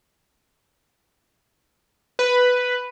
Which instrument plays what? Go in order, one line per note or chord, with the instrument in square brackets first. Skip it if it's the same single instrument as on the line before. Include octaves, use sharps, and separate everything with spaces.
[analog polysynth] B4